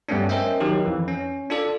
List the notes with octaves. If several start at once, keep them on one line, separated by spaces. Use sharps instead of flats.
G2 G3 A3 B3 C#4 D4
C#4 A#4 C5 D#5 E5 G5
D#3 F#3 D#4 G4
F2 E3
C#4
D4 F4 A4 D5